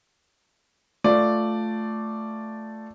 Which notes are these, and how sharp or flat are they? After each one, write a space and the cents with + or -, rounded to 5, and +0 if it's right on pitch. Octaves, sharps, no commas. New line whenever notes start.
A3 +0 F4 +0 D5 +0